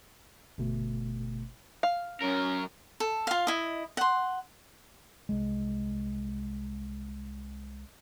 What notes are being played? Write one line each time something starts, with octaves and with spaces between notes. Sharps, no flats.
G1 B2 A3
F5
F#2 C#4 A#4
A4
F4 F5
E4 D#5
F#5 C6
C2 G#3